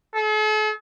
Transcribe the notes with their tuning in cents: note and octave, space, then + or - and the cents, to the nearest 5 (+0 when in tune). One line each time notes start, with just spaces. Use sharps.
A4 -45